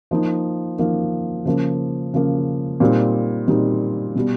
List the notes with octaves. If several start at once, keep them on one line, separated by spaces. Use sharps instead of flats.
F3 A#3 D#4
F3 A#3 D#4
C#3 F3 A#3
C#3 F3 A#3
A#2 G3 C4 D#4
A#2 G3 C4 D#4
B2 G3 B3